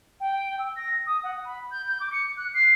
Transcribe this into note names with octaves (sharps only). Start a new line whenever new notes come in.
G5
E6
A#6
D#6
F#5
B5
G6
G6
D6
C#7
F#6
C7